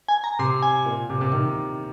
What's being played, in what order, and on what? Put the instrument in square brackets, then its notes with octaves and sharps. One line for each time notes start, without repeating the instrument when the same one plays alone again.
[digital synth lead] G#5
A#5
[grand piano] C3 [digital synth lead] C6
[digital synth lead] G#5
[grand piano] A#2
C3
C3
C3 D#3